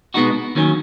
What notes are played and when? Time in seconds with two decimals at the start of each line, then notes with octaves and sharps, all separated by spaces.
0.14 B2 G#3 B3 D#4 F#4
0.55 D#2 D#3 F#3 C#4